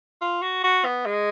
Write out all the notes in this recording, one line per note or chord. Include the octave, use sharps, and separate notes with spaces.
F4
F#4
F#4
B3
G#3